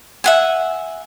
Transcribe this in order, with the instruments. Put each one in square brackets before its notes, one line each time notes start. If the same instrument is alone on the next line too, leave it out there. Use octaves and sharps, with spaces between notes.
[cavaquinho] E5 F#5 G#5